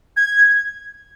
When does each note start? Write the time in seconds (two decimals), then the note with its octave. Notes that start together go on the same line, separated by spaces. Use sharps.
0.17 G#6